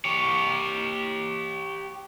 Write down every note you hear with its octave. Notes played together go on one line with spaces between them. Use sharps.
G4 C#5